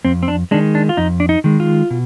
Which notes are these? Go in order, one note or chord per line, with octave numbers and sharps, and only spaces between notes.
F2 C4
C4
D4
D#3 G#3 D4
D4
F4
F2 D#4
D4
D#4
D#3 G#3
F4
B2